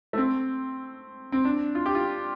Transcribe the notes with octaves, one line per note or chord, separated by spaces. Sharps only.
A3
C4
C4
D4
F4
G4
F4